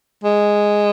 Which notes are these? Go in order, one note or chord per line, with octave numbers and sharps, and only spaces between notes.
G#3